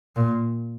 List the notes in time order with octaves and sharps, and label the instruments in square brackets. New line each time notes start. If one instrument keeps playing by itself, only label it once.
[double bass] A#2